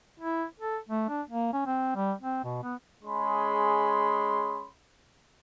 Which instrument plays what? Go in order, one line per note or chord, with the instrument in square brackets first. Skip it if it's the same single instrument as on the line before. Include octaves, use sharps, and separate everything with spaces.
[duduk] E4
A4
A3
D4
A#3
C#4
C4
G3
C4
B2
B3
[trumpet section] G#3 C#4 G#4 B5 C6